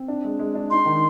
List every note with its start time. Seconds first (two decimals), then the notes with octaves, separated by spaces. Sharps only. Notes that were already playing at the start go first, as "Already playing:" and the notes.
Already playing: C4
0.08 D4
0.24 G#3
0.39 G#3
0.55 D4
0.70 D#4 C6
0.86 D#3